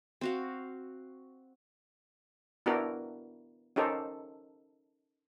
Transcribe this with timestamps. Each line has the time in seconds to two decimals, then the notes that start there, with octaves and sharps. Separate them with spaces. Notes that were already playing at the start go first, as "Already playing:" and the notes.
0.21 C4 F#4 F5
2.66 B3 D4 E4 F#4 G4 A#4
3.76 C#4 D#4 G4 A4 A#4 C5